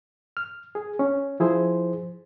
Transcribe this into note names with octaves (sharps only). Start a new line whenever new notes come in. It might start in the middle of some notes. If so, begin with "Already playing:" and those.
F6
G#4
C#4
F3 E4 G#4 C5